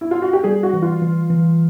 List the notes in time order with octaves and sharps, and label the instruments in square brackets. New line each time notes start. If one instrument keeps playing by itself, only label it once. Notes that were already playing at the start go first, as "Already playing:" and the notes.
[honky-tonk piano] E4
F4
F#4
G4
[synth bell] G3 [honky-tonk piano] G#4
[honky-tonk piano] F#4
[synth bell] E3
[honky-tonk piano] F4
[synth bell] E3
E3